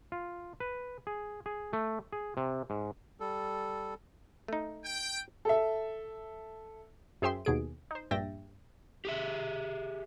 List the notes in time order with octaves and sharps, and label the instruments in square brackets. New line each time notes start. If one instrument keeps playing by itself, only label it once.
[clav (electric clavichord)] F4
B4
G#4
G#4
A3
G#4
C3
G#2
[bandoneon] G3 A4
[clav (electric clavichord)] A3 D#4
[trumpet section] G5
[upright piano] A4 E5
[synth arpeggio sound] F#2 G#4 C5 E5 G5 C6
D#2 B2 G#4 D7
D#4 C5
A#1 G2 E5 G5 A6 A#6
[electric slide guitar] G4 G#4 E5